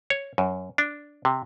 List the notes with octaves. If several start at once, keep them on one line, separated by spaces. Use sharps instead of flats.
C#5
F#2
D4
C3